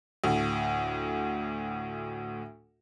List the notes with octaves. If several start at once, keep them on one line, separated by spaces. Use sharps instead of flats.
D2 A2